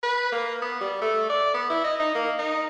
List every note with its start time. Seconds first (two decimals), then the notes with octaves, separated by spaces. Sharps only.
0.03 B4
0.32 A#3
0.62 B3
0.81 G3
1.02 A3
1.30 D5
1.54 B3
1.70 E4
1.84 D#5
2.00 D#4
2.15 A#3
2.39 D#4